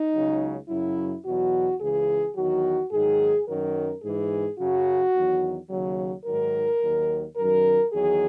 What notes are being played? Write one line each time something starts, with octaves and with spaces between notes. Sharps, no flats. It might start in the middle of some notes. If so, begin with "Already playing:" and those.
Already playing: D#4
C#2 C#3 F#3
F#2 C#3 F#3 E4
E2 B2 F#3 F#4
C#2 C#3 E3 G#4
E2 D#3 F#3 F#4
G#2 D#3 F#3 G#4
F#2 D#3 F#3 A#4
G#2 E3 G#4
F#2 C#3 F#3 F#4
E2 D#3 F#3
D#2 C#3 F#3
G#2 D#3 F#3 A#4
D#2 D#3 F#3
F#2 D#3 F#3 A#4
E2 D#3 F#3 G#4